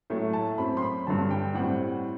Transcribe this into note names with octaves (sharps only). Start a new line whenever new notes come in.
A2 F#3 A3
A5
F#2 F#3 C4 B5
C6
B5
G2 D3 F#3 A5
G5
A2 G3 C4 F#5